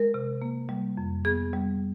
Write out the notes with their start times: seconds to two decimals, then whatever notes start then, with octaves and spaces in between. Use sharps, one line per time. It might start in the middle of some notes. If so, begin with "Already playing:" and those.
Already playing: G#3 A#4
0.14 C3
0.42 A#3
0.69 G3
0.97 F2
1.25 B3 G#4
1.53 G3